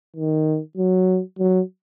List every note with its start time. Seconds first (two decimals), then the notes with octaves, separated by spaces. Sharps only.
0.16 D#3
0.77 F#3
1.39 F#3